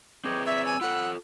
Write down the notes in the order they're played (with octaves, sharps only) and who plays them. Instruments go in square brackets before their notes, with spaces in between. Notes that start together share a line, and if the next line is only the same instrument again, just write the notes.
[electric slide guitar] C4 G#4 B4 [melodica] C#5 D#5 G5 [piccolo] D6
[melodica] C#5 D5 [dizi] E5 [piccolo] E6
[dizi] G#5
[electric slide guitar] F4 A4 [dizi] F#5 [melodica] B5